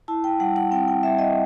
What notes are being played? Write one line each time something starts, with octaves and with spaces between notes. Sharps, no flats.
E4 A5
G5
G3 F#5
F#5
C4 G5
G5
G3 E5
D#5